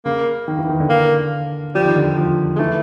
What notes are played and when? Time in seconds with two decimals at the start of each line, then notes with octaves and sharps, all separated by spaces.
0.05 C#3 A#3
0.48 D#3
0.59 E3
0.69 D#3
0.80 D3
0.90 A#3
1.75 F3 G3
1.86 D#3
1.96 D3
2.17 F3
2.56 G#3
2.60 E3 A3